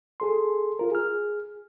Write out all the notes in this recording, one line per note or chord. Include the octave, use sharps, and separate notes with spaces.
G#4 A4 C6
F4 A#4
G#4 F6